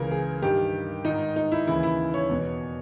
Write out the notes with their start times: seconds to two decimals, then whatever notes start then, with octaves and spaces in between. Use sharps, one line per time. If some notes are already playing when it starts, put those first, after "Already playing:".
Already playing: C#2 C#3 E3 A#4
0.11 G#4
0.42 G2 D#3 G4
1.05 G#2 D#3 D#4
1.36 D#4
1.52 E4
1.67 D#2 C#3 E3 E4
1.83 E4
2.14 C#5
2.29 E2 B2